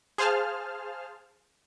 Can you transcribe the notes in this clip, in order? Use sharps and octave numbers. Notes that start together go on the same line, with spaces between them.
G#4 C5 F5 A5 F6